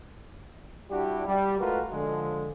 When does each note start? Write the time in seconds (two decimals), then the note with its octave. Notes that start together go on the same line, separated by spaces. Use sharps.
0.91 G3 D4 E4 F#4 G4
1.26 G3
1.59 G#3 A3 F4 F#4 A#4 B4
1.92 D3 F3 G#3